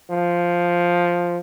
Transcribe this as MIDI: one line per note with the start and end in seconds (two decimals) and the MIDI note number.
0.11 1.38 53